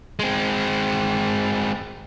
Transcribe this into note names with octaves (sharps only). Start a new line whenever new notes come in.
G#3 C4